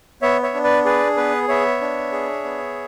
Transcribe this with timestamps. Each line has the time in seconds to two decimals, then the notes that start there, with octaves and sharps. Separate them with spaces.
0.22 B3 C#5 E5
0.43 C#5 E5
0.54 D4
0.64 B4 D5
0.85 G#4 B4 D5
1.17 B3 B4
1.48 B3 C#5 E5
1.81 D4
2.12 G#4
2.44 B3